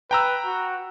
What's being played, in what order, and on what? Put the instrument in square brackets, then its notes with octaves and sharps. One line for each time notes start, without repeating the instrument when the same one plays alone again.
[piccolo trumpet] B4 [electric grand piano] G5 A#5 E6
[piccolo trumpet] F#4